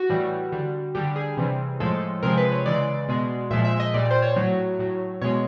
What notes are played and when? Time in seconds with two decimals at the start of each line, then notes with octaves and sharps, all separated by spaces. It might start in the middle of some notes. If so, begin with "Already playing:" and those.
Already playing: F#4
0.10 A2 E3 G3
0.52 D3 G3
0.95 D3 G3 G4
1.16 G#4
1.37 C3 E3 G3
1.80 A2 F3 G#3 A4
2.23 C3 F3 G#3 A#4
2.37 B4
2.52 C#5
2.66 C#3 E3 G#3 D5
3.09 B2 G#3
3.51 A#2 F3 G#3 E5
3.65 E5
3.80 D#5
3.94 A#2 G3 D5
4.11 C5
4.22 C#5
4.36 A2 F#3
4.79 A2 F#3
5.21 B2 G#3 C#5